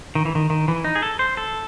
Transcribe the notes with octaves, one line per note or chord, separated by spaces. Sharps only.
D#3
E3
D#3
D#3
E3
D#4
G#4
A4
C5
A4